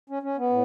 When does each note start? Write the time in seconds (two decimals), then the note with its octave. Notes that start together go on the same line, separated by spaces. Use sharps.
0.10 C#4
0.23 C#4
0.37 B3
0.50 A2